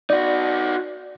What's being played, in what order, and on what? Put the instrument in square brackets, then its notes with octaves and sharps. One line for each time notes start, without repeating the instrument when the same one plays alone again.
[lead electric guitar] D#4 F#4 [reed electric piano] D5